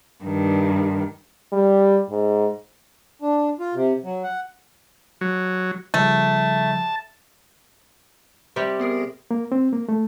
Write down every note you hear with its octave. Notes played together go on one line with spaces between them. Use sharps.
G2 D#3
G3
G#2
D4
F4
C3
F#3
F#5
F#3
C#3 F3 G3 A3 A5
C3 G3 G4
B3 G#4 A#4
A#3
C4
A#3
A3